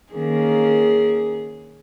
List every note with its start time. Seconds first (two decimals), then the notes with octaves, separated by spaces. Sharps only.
0.13 D#3 A#3 C#4 G#4